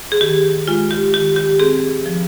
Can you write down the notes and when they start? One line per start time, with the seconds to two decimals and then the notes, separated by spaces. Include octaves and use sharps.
0.12 G#4
0.21 D#3 G4
0.68 G#3 F4
0.91 G4
1.13 D#3 G4
1.36 G4
1.60 C4 G#4
2.06 F3